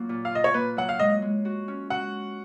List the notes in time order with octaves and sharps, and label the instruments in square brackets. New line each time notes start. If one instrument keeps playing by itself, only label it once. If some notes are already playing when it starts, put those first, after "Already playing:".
Already playing: [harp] F#3 A#3 F4
A#2
[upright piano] F5
[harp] F4 [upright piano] D#5
[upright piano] C#5
[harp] A#3 [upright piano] B4
[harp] F#3 [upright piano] F#5
[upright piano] F5
[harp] G#3 [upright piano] D#5
[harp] G#3
F#4
C#4
[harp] F#4 [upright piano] F#5